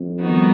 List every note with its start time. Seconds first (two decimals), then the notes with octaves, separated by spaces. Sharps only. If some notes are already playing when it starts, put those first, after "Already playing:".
Already playing: F2
0.21 D#3 G3 B3 D#4 F#4